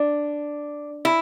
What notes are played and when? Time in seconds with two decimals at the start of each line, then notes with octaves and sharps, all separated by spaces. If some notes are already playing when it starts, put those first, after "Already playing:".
Already playing: D4
1.05 E4